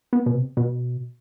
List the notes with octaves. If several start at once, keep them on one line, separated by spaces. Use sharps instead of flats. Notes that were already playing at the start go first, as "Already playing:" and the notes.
B3
B2
C3
B2